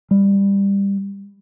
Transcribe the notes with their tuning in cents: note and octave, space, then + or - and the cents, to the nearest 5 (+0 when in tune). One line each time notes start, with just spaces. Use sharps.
G3 +20